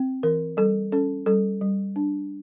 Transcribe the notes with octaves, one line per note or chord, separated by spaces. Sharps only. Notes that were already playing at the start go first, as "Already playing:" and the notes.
Already playing: C4
E3 A#4
G3 A4
C#4 A4
G3 A4
G3
D4